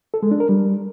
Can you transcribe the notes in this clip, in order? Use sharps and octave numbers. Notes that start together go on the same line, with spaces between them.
A4
G#3
D4
A#4
G3